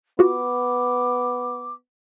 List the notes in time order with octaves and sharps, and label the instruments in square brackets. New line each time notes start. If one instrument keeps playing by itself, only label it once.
[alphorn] B3 [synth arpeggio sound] F4 F#4 [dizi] D6